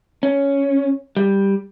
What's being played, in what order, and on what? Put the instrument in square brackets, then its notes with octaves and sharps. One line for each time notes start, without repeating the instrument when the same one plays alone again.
[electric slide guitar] C#4
G3